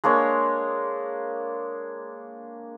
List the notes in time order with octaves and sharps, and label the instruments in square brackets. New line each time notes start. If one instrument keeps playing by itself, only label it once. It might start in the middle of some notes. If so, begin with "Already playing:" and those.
[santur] G#3 A#3 D4 C#5